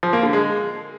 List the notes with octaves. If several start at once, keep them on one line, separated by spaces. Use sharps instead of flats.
F3
A#3
D3
G#3